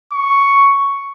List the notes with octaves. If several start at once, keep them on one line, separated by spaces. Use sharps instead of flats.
C#6